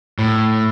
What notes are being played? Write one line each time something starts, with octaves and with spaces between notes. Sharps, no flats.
A2